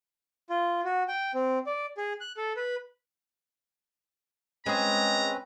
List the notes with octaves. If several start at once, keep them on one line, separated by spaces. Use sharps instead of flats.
F4
F#4
G5
C4
D5
G#4
F#6
A4
B4
G#3 C4 C#4 G#4 B4 A#5